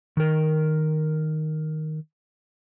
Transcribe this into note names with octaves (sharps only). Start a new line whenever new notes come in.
D#3 A#4